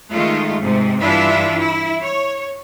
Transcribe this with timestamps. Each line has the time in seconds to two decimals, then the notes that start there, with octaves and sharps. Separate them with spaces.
0.11 D#3 G#3 A3 F4
0.60 G#2 C3
1.01 G2 E3 D4 E4 F4 E5
1.57 E4
2.02 C#5